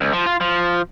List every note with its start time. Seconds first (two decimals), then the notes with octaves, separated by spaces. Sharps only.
0.01 C#2
0.13 F3
0.26 F4
0.41 F3